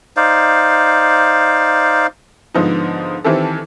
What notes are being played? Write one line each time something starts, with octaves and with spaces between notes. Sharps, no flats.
D#4 C5 D5 F5
G#2 D3 F3 B3 D#4
D#3 E3 C4 E4 G4 A4